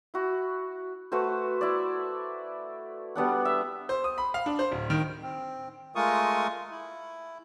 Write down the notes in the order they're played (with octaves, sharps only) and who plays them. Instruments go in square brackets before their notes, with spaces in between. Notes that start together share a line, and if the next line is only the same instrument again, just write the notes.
[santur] E4 F#4
A3 F#4 B4 C5
E4 D5
G3 B3 D4 F#5
E5
[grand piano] C5
D#6
B5
F5
D4
C5
D1
D#3
[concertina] C4
G#3 A3 F4 A#4 C#6 D#6
E4